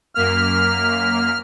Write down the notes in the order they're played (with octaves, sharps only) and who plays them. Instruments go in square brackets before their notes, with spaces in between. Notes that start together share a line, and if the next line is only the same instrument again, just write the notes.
[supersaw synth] F#2 A#3 B6 [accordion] F6